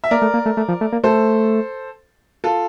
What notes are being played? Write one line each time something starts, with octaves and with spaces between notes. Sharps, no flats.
E5
A#3 A#4 D5
A3
A#3
A3
A3
F3
A3
A#3
A3 A4 C5
F4 A4